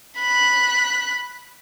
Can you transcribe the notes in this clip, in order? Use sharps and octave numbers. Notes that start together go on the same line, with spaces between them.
B5 F#6